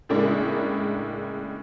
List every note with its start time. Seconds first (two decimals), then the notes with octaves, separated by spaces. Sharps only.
0.09 A2 C#3 G#3 A#3 D4 E4